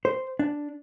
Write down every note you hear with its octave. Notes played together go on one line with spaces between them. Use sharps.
C5
D4